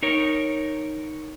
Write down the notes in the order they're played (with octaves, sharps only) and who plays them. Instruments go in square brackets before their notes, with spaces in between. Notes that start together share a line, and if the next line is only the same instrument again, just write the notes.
[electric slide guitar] D#4 A#4 C#5